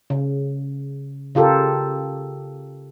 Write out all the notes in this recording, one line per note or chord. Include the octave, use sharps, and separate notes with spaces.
C#3
C#3 F4 G4 A4 A#4